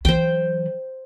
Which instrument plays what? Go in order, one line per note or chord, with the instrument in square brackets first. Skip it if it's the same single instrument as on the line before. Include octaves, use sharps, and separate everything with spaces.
[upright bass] E3 F#3 [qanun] C5 G5